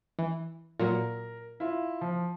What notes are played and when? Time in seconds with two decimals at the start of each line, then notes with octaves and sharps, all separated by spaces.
0.19 E3
0.79 A#2 F#3 A#4
1.60 E4 F4
2.01 F3